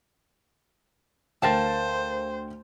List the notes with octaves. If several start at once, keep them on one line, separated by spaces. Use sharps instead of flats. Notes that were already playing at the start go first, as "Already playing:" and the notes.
D2 A#4 C5 F5 G5 A5 A6